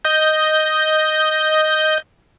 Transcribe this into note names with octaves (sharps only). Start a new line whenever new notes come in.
D#5 G6